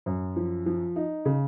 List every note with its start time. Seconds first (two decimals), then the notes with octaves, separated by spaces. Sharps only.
0.06 F#2
0.36 F3
0.66 F3
0.96 D#4
1.25 C#3